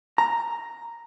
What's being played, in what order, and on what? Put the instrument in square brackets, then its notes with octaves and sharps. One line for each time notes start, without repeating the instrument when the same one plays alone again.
[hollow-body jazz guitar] A#5